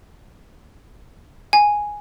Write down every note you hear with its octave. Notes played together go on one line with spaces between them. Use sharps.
G#5